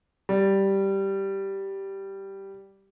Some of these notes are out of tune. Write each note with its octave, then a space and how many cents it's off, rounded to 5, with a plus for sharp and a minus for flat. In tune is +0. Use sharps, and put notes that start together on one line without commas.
G3 -5